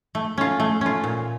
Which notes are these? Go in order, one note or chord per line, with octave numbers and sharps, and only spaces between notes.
A3
C#4 F4
A3
C#4 F4
A#2